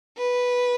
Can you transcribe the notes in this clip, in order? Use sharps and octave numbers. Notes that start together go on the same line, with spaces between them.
B4